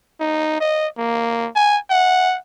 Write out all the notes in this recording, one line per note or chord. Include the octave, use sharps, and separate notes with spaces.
D#4
D#5
A#3
G#5
F#5